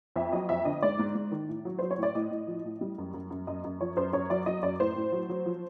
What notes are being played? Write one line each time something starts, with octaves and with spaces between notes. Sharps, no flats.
F2 E5
F#3 D#5
F2 E5
D3 D#5
G#2 D5
G#2
G#2
D#3
A2
F#3
F#3 C5
C#5
A2
D5
A2 D#5
A2
F3
A2
G3
F#2
F#2
F#2
F#2 D#5
F#2
F3 C#5
F#2 C5
F#2 C#5
F#3 D5
F#3 D#5
F#2 D5
A2 C5
A2
F#3
F#3
F3